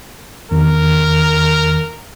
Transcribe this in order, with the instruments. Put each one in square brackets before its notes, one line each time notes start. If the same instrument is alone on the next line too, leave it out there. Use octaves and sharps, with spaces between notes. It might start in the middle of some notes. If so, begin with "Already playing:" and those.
[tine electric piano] E2 D#3 [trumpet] A#4